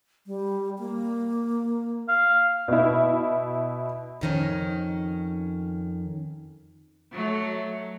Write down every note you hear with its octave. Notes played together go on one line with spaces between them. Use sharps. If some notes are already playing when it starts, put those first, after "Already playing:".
G3
A#3
F5
B2 E4
F2 D#3 C#4
F#3 A3